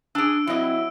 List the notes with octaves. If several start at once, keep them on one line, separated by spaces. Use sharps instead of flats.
D4 G#4 E6 D7
F#3 C4 E4 D#5